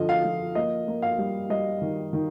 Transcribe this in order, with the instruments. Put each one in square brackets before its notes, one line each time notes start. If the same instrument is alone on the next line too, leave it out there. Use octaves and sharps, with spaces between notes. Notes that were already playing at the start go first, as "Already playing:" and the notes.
Already playing: [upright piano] D3 F3 D#5
F5
F3
A#3 D#5
A#3
F5
G3
G3 D#5
D#3
D#3